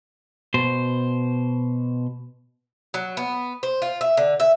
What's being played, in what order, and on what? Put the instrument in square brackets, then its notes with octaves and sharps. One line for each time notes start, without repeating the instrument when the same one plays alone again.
[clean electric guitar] B2 C5
[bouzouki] F#3
B3
C5
F4
E5
D3
E5